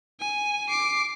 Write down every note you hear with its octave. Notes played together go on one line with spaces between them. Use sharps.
G#5
D6 C7